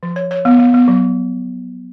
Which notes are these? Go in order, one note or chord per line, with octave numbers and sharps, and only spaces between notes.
F3
C#5
C#5
B3
B3
B3
F#3